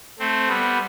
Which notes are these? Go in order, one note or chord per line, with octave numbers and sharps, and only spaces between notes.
A3 C4
G3 B3